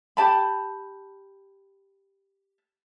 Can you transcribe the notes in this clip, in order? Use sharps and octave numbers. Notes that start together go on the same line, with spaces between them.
G4 A5 B5